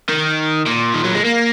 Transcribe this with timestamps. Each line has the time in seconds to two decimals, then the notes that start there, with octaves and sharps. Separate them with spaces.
0.09 D#3
0.66 A#2
0.94 D#3
1.04 F#3
1.15 G#3
1.25 A#3